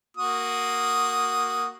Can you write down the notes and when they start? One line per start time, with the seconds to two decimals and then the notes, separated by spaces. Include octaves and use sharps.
0.17 A#3 F#4 D#6